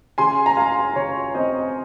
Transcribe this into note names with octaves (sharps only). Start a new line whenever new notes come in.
C#3 G#5 C6
A#5
G#3 F5 G#5
C#3 C#5
C4 C5 D#5